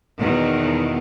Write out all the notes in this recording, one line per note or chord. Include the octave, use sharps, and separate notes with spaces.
E2 B2 D#3